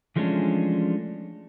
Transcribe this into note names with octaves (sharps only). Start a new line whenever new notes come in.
E3 F3 G#3 A3 C#4 D4